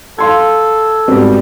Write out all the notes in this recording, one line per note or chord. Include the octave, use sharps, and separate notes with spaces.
A4 F5 C6 G#6
G#2 G3 B3 C4 F#4